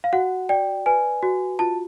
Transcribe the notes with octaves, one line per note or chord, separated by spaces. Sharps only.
F5
F#4 F#5
D5 G5
B4 G#5
F#4
F4 A5